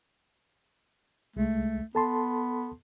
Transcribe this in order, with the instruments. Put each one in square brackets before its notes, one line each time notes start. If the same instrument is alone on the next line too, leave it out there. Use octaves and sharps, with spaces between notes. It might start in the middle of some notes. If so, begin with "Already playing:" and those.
[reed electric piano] C2 G#3 [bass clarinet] A3
[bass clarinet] B3 [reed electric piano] A4 A5 C6